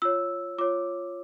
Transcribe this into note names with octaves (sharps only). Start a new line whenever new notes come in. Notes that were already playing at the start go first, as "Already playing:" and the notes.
F4 C#5 E6
F4 C#5 D6